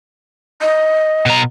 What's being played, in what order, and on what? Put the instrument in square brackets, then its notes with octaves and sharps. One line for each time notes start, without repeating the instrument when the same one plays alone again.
[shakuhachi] D#5
[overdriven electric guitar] B2 A#5